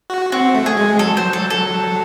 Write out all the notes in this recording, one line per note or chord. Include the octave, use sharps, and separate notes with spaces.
F#4
C4 F#4
A3
G#4
G#3
F#3 A4
C5
A4
A4